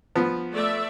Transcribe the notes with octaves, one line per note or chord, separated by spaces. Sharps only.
F3 B3
A3 D5 E5